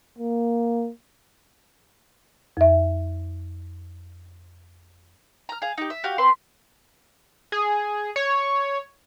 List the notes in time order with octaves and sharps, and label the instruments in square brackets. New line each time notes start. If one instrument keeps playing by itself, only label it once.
[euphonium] A#3
[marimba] F2 E5
[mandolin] A#5 F6
G#4 F5
D#4 G4
E5
F#4 G4 F5
C4 B4 C6
[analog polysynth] G#4
C#5